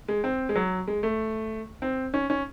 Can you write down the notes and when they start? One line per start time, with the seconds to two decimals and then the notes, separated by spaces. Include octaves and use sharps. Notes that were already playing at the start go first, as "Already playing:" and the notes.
0.08 G#3
0.24 C4
0.49 G#3
0.56 F#3
0.88 G#3
1.03 A3
1.82 C4
2.14 C#4
2.30 C#4